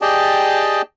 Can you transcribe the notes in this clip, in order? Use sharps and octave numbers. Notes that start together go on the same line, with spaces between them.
G4 G#4 D5 D#5 G5 A5